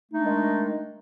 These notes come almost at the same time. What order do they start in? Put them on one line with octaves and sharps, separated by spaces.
A3 D#4 D4 G#3 D#3